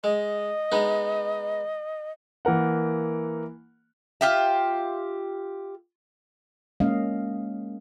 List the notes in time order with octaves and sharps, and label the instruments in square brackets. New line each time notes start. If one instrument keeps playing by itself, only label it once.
[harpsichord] G#3 [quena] D#5
[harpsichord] G#3 B3 D#4
[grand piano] E3 A#3 A#4 F#5
[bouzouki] F4 G4 E5
[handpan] G#3 A#3 C#4 D#5 F5